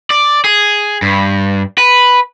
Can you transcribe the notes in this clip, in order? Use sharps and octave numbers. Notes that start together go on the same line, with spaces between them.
D5
G#4
G2
B4